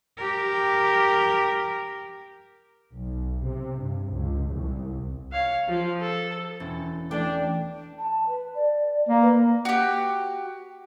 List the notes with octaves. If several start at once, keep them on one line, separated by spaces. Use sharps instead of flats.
G4 A#4
B1
C3
G2
C#2
C2
C#5 F5
F3 F4
A4
E1 C#4 A6
E3 A3 D4 A4 G5
A5
B4
D5
A#3
B4
F#4 G4